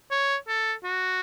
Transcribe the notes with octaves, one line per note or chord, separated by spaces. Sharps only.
C#5
A4
F#4